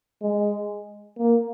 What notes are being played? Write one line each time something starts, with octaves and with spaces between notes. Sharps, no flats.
G#3
A#3